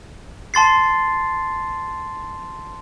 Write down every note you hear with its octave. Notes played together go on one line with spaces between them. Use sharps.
A5 C6 A6 C7